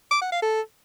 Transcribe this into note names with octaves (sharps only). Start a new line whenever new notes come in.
D6
F#5
F5
A4